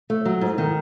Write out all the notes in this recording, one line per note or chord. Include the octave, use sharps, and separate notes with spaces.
A3
F#3
G#2
D#3